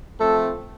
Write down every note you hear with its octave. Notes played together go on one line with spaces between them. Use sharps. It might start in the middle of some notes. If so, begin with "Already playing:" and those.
F3 A3 C4 A4